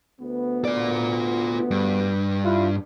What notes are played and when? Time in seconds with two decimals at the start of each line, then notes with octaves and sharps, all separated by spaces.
0.20 D2 B3
0.65 F4 D5
1.71 G2
2.45 E4 F4